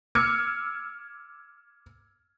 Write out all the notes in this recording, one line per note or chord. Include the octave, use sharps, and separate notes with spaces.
D6 E6 F6 G#6 C#7